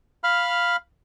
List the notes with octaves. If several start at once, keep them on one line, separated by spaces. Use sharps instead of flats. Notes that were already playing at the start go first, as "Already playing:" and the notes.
F5 B5 F6